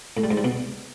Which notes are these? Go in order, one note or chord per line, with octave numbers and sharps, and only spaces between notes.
A2
G3
G#2
G3
B2